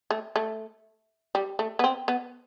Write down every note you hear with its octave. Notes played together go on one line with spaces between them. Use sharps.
A3
A3
G3
A3
B3
C4
B3